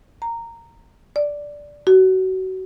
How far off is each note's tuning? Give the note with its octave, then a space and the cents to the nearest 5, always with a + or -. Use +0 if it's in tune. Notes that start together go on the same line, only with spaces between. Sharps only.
A#5 -10
D5 -5
F#4 +25